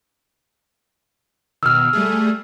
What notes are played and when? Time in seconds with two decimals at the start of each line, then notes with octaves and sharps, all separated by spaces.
1.63 B2 D#3 E6 F6
1.93 G3 A3 G#4